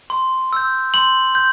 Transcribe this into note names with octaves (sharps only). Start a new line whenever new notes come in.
C6
E6 G6
C6 F#7
G6